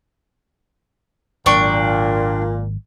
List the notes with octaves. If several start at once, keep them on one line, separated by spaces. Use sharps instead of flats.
G#1 A#2 F#3 D4 G5 C#6